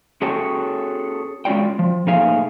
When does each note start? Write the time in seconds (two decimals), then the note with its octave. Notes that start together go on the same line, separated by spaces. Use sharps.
0.22 C#4 F#4 G#4 A4 C#5 G5
1.45 G#3 C#4 F4 F#4 D5 G5
1.79 F3
2.07 A#2 A3 D#4 G#4 F5 G#5